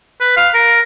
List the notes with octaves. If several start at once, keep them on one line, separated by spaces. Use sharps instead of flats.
B4
F5
A#4